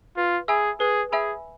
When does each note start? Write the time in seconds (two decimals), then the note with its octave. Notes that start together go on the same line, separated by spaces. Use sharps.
0.17 F4 B4
0.48 G#4 E5 G#5 B5 E6
0.80 G#4 B4
1.11 G#4 E5 G#5 B5 E6